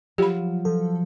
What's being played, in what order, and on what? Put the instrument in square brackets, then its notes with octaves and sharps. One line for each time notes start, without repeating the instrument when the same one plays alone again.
[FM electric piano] F3 [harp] F#3 F4 [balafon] G4 B5
[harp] F3 [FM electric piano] A4